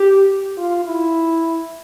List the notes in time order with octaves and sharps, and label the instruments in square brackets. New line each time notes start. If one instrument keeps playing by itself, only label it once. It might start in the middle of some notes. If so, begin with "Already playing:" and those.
Already playing: [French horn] G4
F4
E4